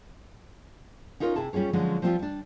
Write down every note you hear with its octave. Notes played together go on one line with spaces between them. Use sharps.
C#4 D#4 F4 A#4 C#5
C3 E4 G#4 A5
G3 C#4 F4 G#4 C#5
D3 F3 F#3 G#3 C#4
F3 G3 C4 D#4 F4 G4
G3 D4